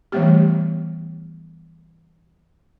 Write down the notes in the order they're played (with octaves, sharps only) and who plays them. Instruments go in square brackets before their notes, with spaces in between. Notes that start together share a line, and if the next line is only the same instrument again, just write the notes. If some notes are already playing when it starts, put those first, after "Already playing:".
[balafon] E3 F3 G3 A3 B3 G4